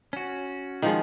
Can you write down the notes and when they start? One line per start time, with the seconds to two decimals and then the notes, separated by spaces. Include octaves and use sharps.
0.13 C#4 F#4
0.82 D#3 F3 G#3